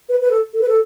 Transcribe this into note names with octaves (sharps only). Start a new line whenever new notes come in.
B4
B4
A4
A4
B4
A4